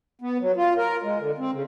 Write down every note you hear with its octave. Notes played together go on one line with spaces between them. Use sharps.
B3
F#3
F4
A#4
G#3
D3
C4
C#3